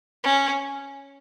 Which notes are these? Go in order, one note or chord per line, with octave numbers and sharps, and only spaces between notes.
C#4